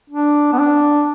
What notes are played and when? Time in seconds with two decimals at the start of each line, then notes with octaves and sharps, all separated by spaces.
0.10 D4
0.53 B3
0.59 D4